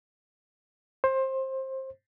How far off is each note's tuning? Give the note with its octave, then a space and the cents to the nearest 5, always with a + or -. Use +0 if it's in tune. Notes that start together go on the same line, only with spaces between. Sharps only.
C5 +20